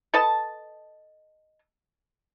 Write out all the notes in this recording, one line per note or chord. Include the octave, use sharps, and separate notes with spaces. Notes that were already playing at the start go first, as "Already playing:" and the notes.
A4 B4 D#5 A5